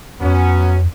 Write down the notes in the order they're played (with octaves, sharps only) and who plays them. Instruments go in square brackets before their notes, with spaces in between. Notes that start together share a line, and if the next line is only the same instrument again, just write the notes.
[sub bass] F2 [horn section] F#3 B3 C#4